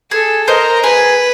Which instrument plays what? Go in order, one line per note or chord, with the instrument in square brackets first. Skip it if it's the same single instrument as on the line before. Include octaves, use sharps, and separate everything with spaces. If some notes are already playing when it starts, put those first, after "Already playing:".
[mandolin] G#4 [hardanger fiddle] A4
[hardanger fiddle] A#4 [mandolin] C5 D#5
[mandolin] G#4 [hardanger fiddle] B4